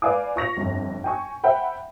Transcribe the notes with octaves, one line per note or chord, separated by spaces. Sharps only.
B4 D5 F5 G#5 D6
F4 C#6 A#6 F7
G1 F2
G5 G#5 C#6
C5 E5 F#5 G5 B5